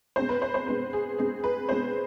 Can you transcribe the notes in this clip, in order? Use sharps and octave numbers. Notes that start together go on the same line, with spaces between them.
B2 G#3 C4 C5
B4
C5
C5
B2 G#3 C4 B4
G#4
B2 G#3 C4 G#4
B4
B2 G#3 C4 C5